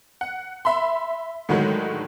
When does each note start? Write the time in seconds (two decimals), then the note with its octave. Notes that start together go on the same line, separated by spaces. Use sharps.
0.21 F#5
0.65 E5 B5 C6
1.49 A2 D3 D#3 F#3 G#3